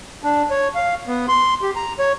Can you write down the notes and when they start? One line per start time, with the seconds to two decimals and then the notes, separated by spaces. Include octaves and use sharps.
0.23 D4
0.50 C#5
0.75 F5
1.07 B3
1.28 C6
1.62 G4
1.76 A#5
1.99 C#5